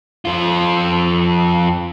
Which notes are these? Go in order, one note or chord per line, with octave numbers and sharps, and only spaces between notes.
F2 F4